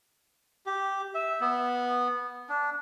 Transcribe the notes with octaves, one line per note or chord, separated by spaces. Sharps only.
G4
E5
B3
D4